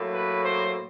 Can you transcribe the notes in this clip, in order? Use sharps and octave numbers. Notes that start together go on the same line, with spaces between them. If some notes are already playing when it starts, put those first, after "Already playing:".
Already playing: A2 F#3 A#3
B4
C5